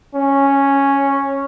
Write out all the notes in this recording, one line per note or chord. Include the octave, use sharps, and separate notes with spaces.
C#4